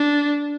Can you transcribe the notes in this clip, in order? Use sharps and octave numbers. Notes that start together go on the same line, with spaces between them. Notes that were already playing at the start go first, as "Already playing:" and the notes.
Already playing: D4